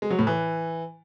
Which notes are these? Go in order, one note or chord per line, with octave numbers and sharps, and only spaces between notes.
G#3
F#3
A2
E3